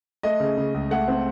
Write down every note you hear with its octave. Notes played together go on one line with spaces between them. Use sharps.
A3 D#5
C#3
C#3
C#2
A3 F#5
C4